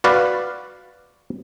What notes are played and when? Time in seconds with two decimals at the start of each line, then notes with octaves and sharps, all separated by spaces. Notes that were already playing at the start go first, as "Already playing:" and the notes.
0.04 F#4 B4 D5 F5